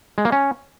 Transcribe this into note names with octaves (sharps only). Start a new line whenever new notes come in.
G#3
A#3
C#4